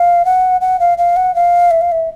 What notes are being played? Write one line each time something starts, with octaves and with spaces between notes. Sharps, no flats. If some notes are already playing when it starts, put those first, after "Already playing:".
Already playing: F5
F#5
F#5
F5
F5
F#5
F5
E5
F5
E5